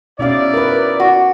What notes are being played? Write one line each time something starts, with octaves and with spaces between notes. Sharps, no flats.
B2 C#4 D#4 E4 D5 F5
A#4 B4
F#4